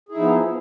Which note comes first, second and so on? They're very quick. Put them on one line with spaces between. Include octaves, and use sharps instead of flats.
G#4 E4 D#4 F3 B3